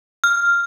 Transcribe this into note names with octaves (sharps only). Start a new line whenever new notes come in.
F6